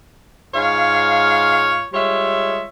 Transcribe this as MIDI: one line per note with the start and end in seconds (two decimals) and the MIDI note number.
0.53 1.84 44
0.53 1.84 65
0.53 1.84 73
0.53 1.84 77
1.93 2.62 55
1.93 2.62 56
1.93 2.62 65
1.93 2.62 73
1.93 2.62 76